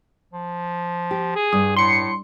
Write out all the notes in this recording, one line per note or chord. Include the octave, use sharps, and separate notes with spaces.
F3
G4
G#4
G2 D#6
A2 C6 C#7